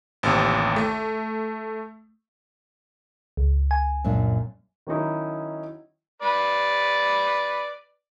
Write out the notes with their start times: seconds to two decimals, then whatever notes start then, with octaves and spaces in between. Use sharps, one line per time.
0.23 A1 D#2 C3
0.76 A3
3.37 C#2
3.71 G#5
4.04 F#2 A#2 D4
4.87 D#3 F#3 C#4 D#4 E4
6.22 B4 D5